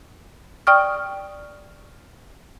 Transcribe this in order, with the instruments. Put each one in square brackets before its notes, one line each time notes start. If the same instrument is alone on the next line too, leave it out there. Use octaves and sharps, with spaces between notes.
[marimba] D5 G5 C#6 D#6 F6